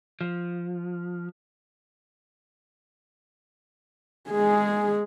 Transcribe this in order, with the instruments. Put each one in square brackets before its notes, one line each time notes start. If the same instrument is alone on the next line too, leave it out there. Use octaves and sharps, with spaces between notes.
[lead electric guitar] F3
[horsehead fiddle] G#3 G#4